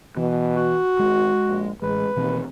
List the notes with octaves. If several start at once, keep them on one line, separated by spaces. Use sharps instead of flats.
B2 E3
F#4
G#1 G#3
A#1
A1 G#3 B4
D#2 B2 E3 C4